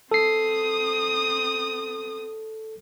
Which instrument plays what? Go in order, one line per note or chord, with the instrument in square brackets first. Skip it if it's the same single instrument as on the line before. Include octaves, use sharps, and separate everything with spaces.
[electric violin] C4 D#6 [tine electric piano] A4 C7